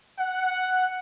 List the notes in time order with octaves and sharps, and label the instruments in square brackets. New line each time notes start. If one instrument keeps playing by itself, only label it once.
[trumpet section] F#5